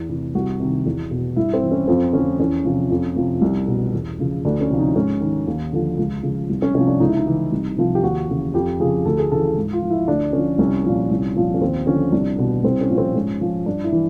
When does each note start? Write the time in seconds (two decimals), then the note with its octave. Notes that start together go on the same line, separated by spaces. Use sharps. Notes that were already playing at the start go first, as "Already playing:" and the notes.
Already playing: E2
0.09 C3 E3
0.35 C2 F#4
0.60 C3 D#3
0.86 E2
1.11 B2
1.36 G2 E4
1.54 C4
1.62 E3
1.72 C#4
1.88 F2 C4
2.13 D3 F3 C#4
2.39 E2 C#4
2.65 C3 F3
2.90 F2
3.16 C3 F3
3.41 C2
3.68 B2
3.94 E2
4.19 C#3 F3
4.45 D2 D4
4.61 C#4
4.70 C3 F3
4.78 D#4
4.96 G#2 C#4
5.21 D#3
5.47 D#2
5.72 D3 F3
5.98 C#2
6.23 C#3 F3
6.49 C2
6.62 C#4
6.75 C3 F3 C#4
6.87 D4
7.00 C#2 D#4
7.08 E4
7.17 D#4
7.26 C#3 E3
7.52 C2
7.77 C3 F3
7.95 G4
8.03 D#2 F#4
8.28 C#3 E3
8.54 F2 G4
8.80 C#3 F3 G#4
9.05 D2 A4
9.19 G#4
9.31 C#3 E3 A4
9.44 A4
9.56 G#2
9.73 F4
9.83 F3
9.90 E4
10.08 D2 D4
10.33 D3 F3 C#4
10.58 C2 C#4
10.85 A#2 F3
11.11 C2
11.36 A#2 F3
11.54 C#4
11.61 D#2 C4
11.87 D3 F3 C#4
12.12 C2 D4
12.38 B2
12.64 C2 C4
12.81 C#4
12.90 A#2 F3
12.98 C4
13.15 G#2 C#4
13.41 F3
13.66 G2 D4
13.84 E4
13.92 E3